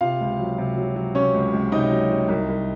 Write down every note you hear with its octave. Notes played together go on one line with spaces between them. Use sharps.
C3 F4 F5
C#2
F#3
C3
F#3
F#3
C3 C#4 C#5
C#2
C#2
C3 D#4 D#5
F#3
F#3
C2
C2